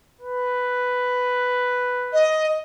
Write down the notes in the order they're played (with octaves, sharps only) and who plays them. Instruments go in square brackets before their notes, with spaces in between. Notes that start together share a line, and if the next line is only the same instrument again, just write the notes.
[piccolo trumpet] B4
[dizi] D#5